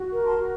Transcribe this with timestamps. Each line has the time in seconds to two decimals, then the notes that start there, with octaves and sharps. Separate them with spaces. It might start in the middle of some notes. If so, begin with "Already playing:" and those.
Already playing: F#4
0.11 A#4
0.25 A5 C6
0.38 F#4